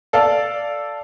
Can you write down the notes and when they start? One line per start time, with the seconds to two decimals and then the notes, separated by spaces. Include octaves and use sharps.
0.13 A4 D5 F5